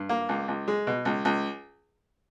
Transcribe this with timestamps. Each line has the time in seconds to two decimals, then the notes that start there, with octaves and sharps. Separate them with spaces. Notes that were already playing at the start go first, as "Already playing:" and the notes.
Already playing: G2
0.09 A#3
0.29 C#2
0.48 C#2
0.68 G#3
0.87 B2
1.05 C#2
1.25 C#2